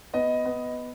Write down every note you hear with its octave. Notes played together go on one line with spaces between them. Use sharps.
B3 D#5
B3